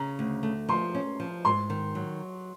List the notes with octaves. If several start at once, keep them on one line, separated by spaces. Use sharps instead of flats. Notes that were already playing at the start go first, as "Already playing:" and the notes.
Already playing: C#3 A#5
D2
A3
F3 C6
C#4
F3
G#2 C6
D#3
F#3